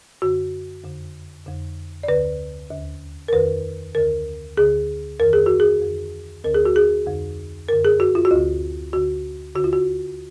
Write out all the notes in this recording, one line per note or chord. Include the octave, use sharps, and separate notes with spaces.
F#2 D3 F#4
F2 D3
F2 D3
D5
D2 D3 B4
D#2 D3
A#4
F2 D#3 B4
D2 D3 A#4
D2 D3 G#4
F2 D#3 A#4
G#4
F#4
G#4
F2 D3
D2 D3 A#4
G#4
F#4
G#4
F2 D3
F#2 D3 A#4
G#4
F#4
F4
F#4
D2 D3 F4
D2 D3 F#4
D#2 D3 F#4
F4
F#4